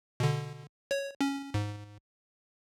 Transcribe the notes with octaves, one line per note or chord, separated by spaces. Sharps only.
B2 D3
C#5
C#4
G#2